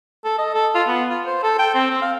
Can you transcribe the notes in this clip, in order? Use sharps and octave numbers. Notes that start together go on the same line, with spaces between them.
A4
D#5
A4
F4
B3
F4
C5
A4
G5
C4
C4
F5